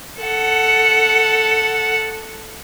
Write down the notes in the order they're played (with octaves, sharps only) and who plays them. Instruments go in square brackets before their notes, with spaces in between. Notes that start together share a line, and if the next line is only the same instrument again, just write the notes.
[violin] A4 F#5